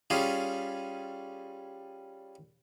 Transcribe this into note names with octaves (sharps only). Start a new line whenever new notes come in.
G3 C#4 F4 G#4